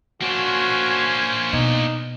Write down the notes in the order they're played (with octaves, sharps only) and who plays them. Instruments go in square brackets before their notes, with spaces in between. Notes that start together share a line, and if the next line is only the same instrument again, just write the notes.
[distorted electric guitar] A#3 D4 [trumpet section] C#4 C5 G#5 [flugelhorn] F#4
[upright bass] B2 [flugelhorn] D#4